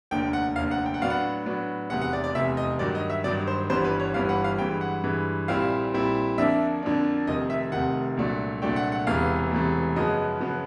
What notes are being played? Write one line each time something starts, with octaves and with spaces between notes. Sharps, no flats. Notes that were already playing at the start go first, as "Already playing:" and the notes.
F1 D#2 D3 G5
F#5
F1 D#2 D3 F5
F#5
G5
F#5
A2 F#3 B3 D4 F5
F#5
A2 F#3 B3 D4
F1 E2 C3 F#5
F#5
D5
D5
F1 E2 C3 E5
D#5
G2 D#3 F#3 D5
D#5
E5
G2 D#3 F#3 D5
C5
G1 G2 E3 G3 B3 C5
B4
C#5
G1 G2 E3 G3 B3 F5
F#5
F5
G2 E3 G#3 G5
F#5
G2 E3 G#3
A#1 A#2 G3 C4 E4 F5
A#1 A#2 G3 C4 E4
F2 D3 F3 A#3 D4 E5
F2 D3 F3 A#3 D4
F1 F2 C3 D#3 D#5
E5
F1 F2 C3 D#3 F#5
C2 A#2 F#3 A3 D4
C2 A#2 F#3 A3 D4 G5
F#5
F#5
E1 E2 C3 E3 A3 F5
E1 E2 C3 E3 A3
F#2 C#3 F3 G#3 B3 D#5
F#2 C#3 F3 G#3 B3